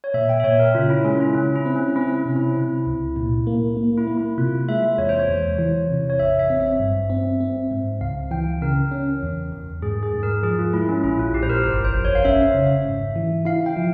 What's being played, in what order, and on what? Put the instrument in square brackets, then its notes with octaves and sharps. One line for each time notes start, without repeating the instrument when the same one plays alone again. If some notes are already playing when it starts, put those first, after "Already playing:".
[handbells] C#5
[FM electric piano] A#2 [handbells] E5
[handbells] G5
E5
[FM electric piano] A#2 [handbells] C#5
[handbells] A#4
[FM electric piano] C#3 [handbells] F4
[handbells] E4
[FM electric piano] G#3 [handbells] C#4
[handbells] E4
[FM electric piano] C#3 [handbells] C#4
[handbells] E4
[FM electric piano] C4
[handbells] C#4
[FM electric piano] C4 [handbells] E4
[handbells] C#4
[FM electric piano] C3
[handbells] E4
[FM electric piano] C3
C#2
A#2
A#3
A#3
[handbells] E4
[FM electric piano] A#3
[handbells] E4
[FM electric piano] C3 [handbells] F4
[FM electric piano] G#3 [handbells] E5
[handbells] E5
[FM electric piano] E2 [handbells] C#5
[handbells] C5
C#5
[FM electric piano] E2
E3
C3
[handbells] C#5
[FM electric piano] G#1 [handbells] E5
[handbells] E5
[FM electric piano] C4
[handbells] E5
[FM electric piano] G2
C4
C4
G#2
[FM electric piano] C#2 [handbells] F5
[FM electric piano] E3 [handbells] G5
[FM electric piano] C#3 [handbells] A#4
[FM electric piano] C#4
E2
E2
[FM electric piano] G#2 [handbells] G#4
[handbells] G#4
[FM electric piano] G#2
[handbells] A#4
[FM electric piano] F3 [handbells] G#4
[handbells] F4
[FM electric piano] G#3 [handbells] E4
[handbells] C#4
[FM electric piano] A#1 [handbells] E4
[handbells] F4
[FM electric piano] A#1 [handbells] G4
[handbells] C5
A#4
[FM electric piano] G1 [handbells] A#4
[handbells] C5
[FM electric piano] F2
[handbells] C#5
F5
[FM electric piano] C#4 [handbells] E5
[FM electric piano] C#3
G#2
E3
[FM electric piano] E4 [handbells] F5
[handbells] G5
[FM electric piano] F3